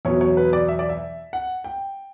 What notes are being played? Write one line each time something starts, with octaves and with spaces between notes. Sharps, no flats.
E2 B2 F#3 C#5
C#5
B4
D5
E5
D5
E5
F#5
G5